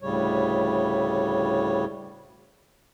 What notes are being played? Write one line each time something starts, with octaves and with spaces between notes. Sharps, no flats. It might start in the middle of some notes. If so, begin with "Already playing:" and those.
D2 A2 C#3 G3 C#5